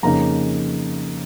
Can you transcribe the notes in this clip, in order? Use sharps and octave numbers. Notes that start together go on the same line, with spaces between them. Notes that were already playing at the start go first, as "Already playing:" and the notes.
F2 C#3 A#3 D#4 A#5